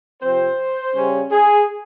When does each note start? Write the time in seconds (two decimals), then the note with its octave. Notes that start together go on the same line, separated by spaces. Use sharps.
0.21 C3 F3 C4 C5
0.95 C#3 G3 C#4
1.32 G#4